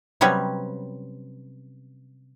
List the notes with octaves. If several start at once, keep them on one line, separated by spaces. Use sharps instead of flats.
C3 F#3 G3 B3 C#4